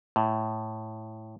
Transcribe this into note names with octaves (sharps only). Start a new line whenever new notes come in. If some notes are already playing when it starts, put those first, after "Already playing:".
A2